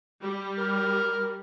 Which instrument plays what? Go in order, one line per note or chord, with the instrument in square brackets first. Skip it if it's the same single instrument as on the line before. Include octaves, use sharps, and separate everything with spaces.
[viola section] G3
[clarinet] A#4